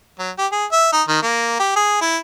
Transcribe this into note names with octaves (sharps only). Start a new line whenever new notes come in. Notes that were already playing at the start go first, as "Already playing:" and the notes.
F#3
G4
G#4
E5
D#4
D#3
A#3
G4
G#4
E4